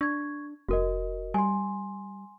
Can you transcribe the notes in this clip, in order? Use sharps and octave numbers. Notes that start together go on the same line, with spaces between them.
D4 C#6 G#6
F1 F#4 A#4 D#5
G3 G#5 C6